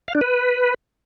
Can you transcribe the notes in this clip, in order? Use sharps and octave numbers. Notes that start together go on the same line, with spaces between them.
F5
D4
B4